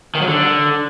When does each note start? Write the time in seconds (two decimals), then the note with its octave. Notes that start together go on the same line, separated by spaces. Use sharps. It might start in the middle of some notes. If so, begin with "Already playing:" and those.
0.15 D#3
0.21 F#3
0.28 D3